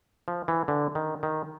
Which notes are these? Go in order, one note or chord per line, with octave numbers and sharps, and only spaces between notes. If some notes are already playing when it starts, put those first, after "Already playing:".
F3
E3
D3
D#3
D#3